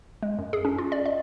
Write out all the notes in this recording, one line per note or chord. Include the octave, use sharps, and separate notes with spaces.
G#3
F#2
G#4
C#4
F4
D5
D#5